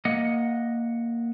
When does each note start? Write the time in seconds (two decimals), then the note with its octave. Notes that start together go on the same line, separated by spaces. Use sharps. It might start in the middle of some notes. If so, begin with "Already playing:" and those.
0.05 A#3 D#5 F#5